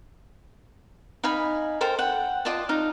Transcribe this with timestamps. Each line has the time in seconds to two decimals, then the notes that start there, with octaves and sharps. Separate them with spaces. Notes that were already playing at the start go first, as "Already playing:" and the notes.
1.24 D#4 F5 G#5 B5
1.81 A4 A#4 C5 G5
1.99 F#5 G5
2.45 F4 D5 D#5 A5
2.69 D#4 F5